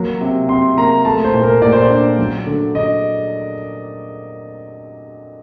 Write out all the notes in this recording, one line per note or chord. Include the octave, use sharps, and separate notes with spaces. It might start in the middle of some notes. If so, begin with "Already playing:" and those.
Already playing: F#3 A#3
C3
C3 C6
A#3 A#5
A3 A5
C5
A#2
A#4
A#2 D5
C5
D5
D4
F#3
D3
D3 D#5